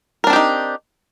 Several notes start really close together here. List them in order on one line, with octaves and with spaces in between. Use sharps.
A#4 D4 C4 G4 D#4